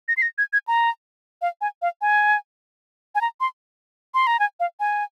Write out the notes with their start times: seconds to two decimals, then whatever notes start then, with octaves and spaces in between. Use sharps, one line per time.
0.08 A#6
0.17 C7
0.22 A#6
0.38 G#6
0.53 G#6
0.68 A#5
1.42 F5
1.61 G#5
1.82 F5
2.01 G#5
3.15 G#5
3.21 A#5
3.40 C6
4.14 C6
4.27 A#5
4.40 G#5
4.60 F5
4.80 G#5